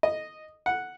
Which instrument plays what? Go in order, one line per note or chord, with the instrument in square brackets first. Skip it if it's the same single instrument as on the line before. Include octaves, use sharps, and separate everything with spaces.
[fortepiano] D#5
F#5